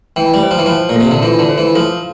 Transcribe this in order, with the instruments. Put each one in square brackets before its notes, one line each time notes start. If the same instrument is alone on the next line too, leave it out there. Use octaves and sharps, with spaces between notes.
[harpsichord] E3 [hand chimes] G5
[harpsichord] G3
[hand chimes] C5
[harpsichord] F3
E3
[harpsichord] F3 [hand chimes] C5
[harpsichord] A#2
[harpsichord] C3 [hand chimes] A4
[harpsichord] D3
[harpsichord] E3 [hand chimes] F4
[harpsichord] D3
[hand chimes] C5
[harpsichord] E3
[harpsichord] F3 [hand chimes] A4